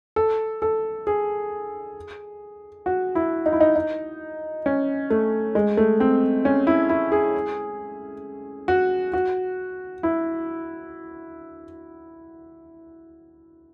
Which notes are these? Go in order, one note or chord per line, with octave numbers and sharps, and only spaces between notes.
A4
A4
G#4
F#4
E4
D#4
E4
D#4
D#4
C#4
A3
G#3
A3
C4
C#4
E4
E4
G#4
F#4
F#4
E4